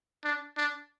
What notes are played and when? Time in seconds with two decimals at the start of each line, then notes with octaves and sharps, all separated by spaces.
0.24 D4
0.57 D4